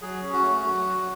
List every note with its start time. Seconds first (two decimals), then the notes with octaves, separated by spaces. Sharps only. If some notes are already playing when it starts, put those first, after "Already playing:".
0.02 F#3 G#4
0.22 C#4
0.33 F#4
0.43 A3
0.64 F#3
0.86 F#3